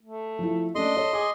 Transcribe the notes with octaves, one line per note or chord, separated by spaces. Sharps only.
A3
F3 E4
A3 C#4 D4 D#5 C6
A4 C#5
G#4 D6